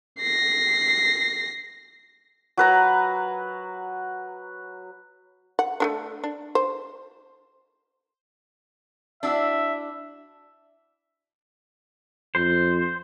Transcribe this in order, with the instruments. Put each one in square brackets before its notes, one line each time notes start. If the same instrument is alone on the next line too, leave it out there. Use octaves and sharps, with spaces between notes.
[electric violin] A#6 C7
[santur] F#3 B4 A#5
[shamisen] F#5
A3 B3 D4
D4
C5
[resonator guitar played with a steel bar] D4 E4 F#4 [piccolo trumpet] E5
[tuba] F2 [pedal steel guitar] C5